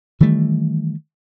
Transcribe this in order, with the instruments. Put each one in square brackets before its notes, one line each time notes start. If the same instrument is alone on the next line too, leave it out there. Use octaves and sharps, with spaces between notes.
[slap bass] D#3 E3 G3 A3